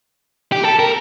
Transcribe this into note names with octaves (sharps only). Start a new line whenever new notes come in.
G4
A4
A#4